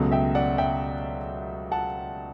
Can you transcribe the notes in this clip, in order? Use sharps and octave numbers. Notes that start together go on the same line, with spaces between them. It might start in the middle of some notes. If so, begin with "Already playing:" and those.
Already playing: C#2 B2 F#3 A3
E5 G5
D5 F#5
E5 G5
F#5 A5